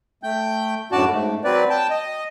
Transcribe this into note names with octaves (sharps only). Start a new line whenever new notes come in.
A3 G5 G6
F#2 A2 D3 F#4 D5 A5
G#2 A3
F#3 C4 B4 D5
G5 A5
D#5